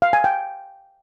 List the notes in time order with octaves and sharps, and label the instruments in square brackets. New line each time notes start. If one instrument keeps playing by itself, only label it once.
[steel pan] F5
G#5
G5